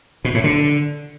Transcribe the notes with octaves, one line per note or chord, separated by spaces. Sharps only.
B2
A2
D3